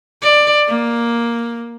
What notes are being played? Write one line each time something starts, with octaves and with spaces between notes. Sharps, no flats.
D5
A#3